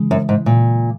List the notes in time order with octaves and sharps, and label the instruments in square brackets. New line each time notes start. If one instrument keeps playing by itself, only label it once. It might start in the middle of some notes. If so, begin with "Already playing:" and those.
Already playing: [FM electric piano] C#3 E3 G#3
[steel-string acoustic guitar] F#2
G#2
A#2